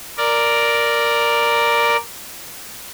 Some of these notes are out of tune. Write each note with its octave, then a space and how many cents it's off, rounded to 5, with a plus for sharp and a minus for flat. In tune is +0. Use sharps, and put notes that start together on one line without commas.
A#4 +0 D5 +0